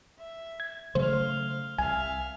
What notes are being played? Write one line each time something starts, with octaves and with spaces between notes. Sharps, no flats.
E5
G#6
C#3 F#3 A3 C5 F5 C6
C2 E5 F5 G#5